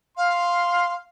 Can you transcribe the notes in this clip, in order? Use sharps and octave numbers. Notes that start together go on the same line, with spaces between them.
F5 C6